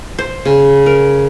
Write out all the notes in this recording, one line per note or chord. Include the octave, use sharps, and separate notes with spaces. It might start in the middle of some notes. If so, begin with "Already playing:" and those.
C5
C#3
A#4